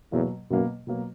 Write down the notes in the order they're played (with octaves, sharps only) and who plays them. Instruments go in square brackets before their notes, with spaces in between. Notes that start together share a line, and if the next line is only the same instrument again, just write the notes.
[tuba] E2 [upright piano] B2 F#3 A#3
[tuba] F#2 [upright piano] B2 F#3 A#3
[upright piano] B2 F#3 A#3